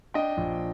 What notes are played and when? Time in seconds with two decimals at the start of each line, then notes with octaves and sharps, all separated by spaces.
0.14 D4 D#5 G5
0.37 A#1